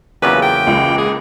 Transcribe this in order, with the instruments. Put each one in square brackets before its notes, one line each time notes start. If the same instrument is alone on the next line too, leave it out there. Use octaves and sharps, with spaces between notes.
[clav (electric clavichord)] E2 C#3 F#3 [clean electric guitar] A#3 F4 G4 [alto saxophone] B4
[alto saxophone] G5
[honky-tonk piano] C#2
[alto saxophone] G#4